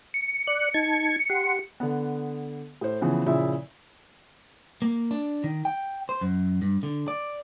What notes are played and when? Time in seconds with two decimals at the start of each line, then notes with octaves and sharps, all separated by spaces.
0.14 C#7
0.47 D5 F#6
0.74 D#4 A5 G#6
1.30 G4 F#5 C6
1.80 D3 B3
2.81 A2 C5
3.01 C#3 E3 F3 B3
3.26 A#2 C#3 F3 E4 E5
4.82 A#3
5.11 D4
5.44 D#3
5.65 G5
6.09 C5
6.21 F#2
6.62 G2
6.83 D3
7.08 D5